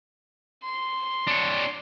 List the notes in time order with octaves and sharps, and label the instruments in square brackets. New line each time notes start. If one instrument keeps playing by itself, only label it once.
[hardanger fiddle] C6
[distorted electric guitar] D4 C#5